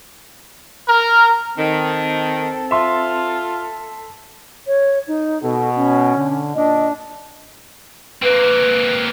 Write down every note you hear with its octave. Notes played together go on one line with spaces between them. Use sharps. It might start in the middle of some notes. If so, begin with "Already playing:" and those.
A#4
D#3 C4 A4
F4 E5 C6
C#5
D#4
B2 A4
C#4
D3
A#2 D4 D#5
A#3 C4 B4